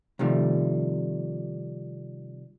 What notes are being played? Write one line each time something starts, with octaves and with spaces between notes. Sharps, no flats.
C3 D#3 F3 G3 A3